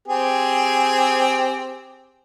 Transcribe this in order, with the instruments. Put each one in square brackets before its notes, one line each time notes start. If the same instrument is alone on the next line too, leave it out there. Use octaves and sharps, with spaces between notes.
[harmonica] C4 G4 G#4